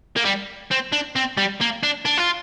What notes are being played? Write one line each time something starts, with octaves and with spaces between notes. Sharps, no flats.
A#3
G3
C4
D4
C4
G3
A#3
D4
D4
F4